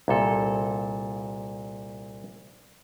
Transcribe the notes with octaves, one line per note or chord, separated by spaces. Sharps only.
C2 A#2 A4